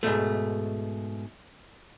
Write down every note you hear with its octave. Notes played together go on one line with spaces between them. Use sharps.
G#2 B2 A3